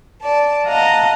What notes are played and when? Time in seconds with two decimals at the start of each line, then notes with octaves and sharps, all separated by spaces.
0.22 D5 A5
0.67 D#5 F5 F#5 A5 A#5